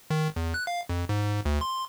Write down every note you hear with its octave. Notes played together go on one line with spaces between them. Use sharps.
D#3
E2
F#6
F5
F2
G#2
D2
C6